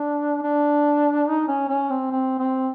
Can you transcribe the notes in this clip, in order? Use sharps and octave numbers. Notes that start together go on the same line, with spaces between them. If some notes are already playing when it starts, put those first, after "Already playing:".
Already playing: D4
D4
D#4
C#4
C#4
C4
C4
C4